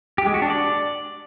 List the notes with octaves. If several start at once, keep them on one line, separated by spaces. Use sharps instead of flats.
G4
G#3
F#4
D4
D5